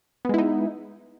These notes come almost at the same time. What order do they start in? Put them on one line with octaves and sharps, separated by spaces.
B3 G#3 E4 D#4